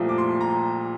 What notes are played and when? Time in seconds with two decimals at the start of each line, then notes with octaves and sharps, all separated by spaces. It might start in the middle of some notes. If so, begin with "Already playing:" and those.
Already playing: C2 A#2 F3 A3
0.09 D6
0.18 C6
0.41 A#5